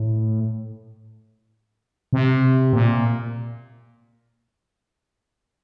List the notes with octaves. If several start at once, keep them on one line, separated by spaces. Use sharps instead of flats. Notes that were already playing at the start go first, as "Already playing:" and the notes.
Already playing: A2
C3
A#2